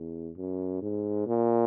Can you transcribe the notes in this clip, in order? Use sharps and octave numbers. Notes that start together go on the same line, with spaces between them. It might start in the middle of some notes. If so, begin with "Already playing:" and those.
Already playing: E2
F#2
G#2
A#2